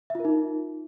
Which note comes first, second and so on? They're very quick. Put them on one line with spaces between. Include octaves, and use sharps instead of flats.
E5 F4 A#4 D#4